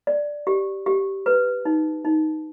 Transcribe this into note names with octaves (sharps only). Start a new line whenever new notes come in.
D5
G4
G4
B4
D#4
D#4